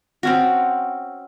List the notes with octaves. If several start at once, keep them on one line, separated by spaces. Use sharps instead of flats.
C4 C#4 F#4